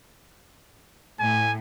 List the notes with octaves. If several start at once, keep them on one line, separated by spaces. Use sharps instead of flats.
A2 G#5